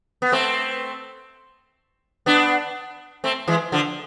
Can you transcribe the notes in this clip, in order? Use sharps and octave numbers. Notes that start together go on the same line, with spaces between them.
B3
A3 C4
B3 D4
A3 C4
E3 G#3
D3 F3